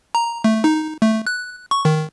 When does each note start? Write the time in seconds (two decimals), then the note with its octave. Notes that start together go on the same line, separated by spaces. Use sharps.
0.15 A#5
0.44 A3
0.64 D#4
1.02 A3
1.27 F#6
1.71 C#6
1.85 D#3